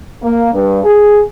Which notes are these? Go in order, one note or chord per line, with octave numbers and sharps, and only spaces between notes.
A#3
G2
G#4